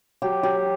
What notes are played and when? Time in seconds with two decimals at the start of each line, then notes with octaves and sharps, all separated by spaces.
0.22 F#3 G4
0.43 F#3 G4